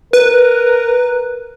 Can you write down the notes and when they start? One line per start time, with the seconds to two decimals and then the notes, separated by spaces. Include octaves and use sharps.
0.13 A#4 B4